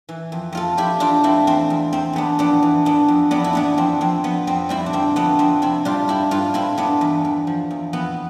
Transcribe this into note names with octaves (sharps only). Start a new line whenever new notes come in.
E3
F2
F2 F4 A4
F2 E4 G4
F2 D4 F4
A3 C4 E4
E2 C4
E2
E2 C4
E2 B3 D4
F2 B3 D4
E3
E3 B3 D4
F2
F2 B3 D4
E4
E3 B3 D4
F2 C4
F2 C4
F2 B3
F2 C4
G3 C4 E4
D4
D3 C4
F2 B3 D4
F2 C4
C3 C4 E4
G3 D4 F4
G2 E4 G4
G2 F4 A4
G2 C4 E4
G2 B3 D4
E2
E2
F3
E2
F2 B3